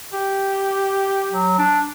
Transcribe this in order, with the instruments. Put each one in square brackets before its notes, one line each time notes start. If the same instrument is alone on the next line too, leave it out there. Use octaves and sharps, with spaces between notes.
[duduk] G4
[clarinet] F#3
D4